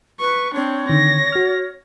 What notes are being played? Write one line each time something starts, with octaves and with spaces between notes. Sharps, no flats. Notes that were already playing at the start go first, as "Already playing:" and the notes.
B4 C#6
C4 D4 C#5
D3 D#3 A#6
F#4 F6